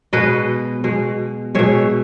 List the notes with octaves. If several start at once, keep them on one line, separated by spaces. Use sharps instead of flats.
B2 G#3 B4 D#5
B2 G#3
B2 G#3 C#5 E5